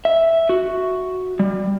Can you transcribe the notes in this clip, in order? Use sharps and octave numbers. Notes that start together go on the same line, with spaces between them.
E5
F#4
G3